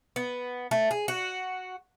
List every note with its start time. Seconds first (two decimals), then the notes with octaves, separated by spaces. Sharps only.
0.16 B3
0.71 A3
0.91 G#4
1.08 F#4